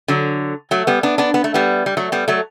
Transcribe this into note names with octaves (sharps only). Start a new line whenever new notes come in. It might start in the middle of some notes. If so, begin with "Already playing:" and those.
D3 F#3
F#3 A3
G3 B3
B3 D4
B3 D4
B3
A3
G3 B3
G3
F#3 A3
G3 B3
F#3 A3